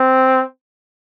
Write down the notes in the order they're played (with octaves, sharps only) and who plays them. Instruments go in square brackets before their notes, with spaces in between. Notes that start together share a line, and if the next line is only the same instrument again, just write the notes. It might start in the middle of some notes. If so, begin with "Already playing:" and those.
Already playing: [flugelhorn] C4